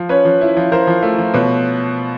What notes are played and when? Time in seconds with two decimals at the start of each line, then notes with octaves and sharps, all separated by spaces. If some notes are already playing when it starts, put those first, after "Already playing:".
Already playing: F3
0.09 C#4 B4 C#5
0.25 F3
0.41 E4
0.57 F3
0.72 F3 A#4 C5
0.87 F3
1.03 A3
1.18 F3
1.34 B2 B4 C#5